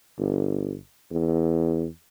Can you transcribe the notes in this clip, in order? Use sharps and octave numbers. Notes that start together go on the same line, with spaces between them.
G1
E2